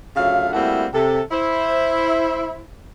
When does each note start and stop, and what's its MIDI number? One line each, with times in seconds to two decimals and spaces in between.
0.16 0.49 38
0.16 0.49 49
0.16 0.49 54
0.16 0.49 57
0.16 0.49 65
0.16 0.49 77
0.53 0.86 55
0.53 0.86 57
0.53 0.86 58
0.53 0.86 60
0.53 0.86 64
0.53 0.86 66
0.93 1.20 48
0.93 1.20 69
1.32 2.63 64
1.32 2.63 72